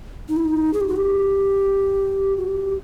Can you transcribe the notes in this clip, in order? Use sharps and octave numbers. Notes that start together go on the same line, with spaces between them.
D#4
E4
D#4
G#4
G4
F#4
G4
F#4
G4